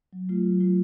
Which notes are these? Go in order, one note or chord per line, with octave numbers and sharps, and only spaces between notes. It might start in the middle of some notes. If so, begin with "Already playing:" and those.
F#3
A3 F4
F#3
A3 F4